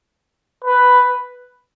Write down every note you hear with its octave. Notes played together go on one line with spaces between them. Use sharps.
B4